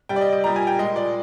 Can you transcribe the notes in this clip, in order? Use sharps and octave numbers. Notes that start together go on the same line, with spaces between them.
C3 G3 G5
D5
D#5
D#5
A#2 G3 A#5
G#5
G5
A#2 G#3 D#5
D5